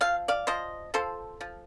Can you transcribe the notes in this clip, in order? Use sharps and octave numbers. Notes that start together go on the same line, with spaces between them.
F3 F5
D5 F5
F3 C5 D#5
F3 A4 C5
F3